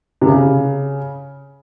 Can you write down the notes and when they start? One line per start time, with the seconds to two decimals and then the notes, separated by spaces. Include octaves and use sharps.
0.22 C3
0.27 C#3